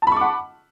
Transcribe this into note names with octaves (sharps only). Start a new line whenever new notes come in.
F#5 A5 B5 C#6 D6